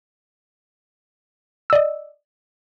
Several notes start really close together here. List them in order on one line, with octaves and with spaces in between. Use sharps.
E6 D5 D#5